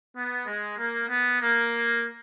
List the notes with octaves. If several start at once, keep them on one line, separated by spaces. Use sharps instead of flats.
B3
G#3
A#3
B3
A#3